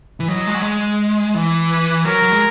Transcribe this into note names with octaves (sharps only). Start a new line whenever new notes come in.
E3
F#3 D#5
G#3
F#3
G#3
E3
B4
F#3 A#4
F#3
G#3